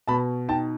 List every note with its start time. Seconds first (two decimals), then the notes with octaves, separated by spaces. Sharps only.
0.07 B2 A5 B5
0.49 D#4 G5 A5